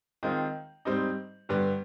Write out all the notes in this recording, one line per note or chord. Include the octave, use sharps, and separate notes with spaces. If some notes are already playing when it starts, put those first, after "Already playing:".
D#3 G#3 C4 F4
G#2 G3 C4 D#4
G2 D3 G3 B3